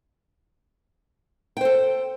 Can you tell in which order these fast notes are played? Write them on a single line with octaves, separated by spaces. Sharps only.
G5 C5 A4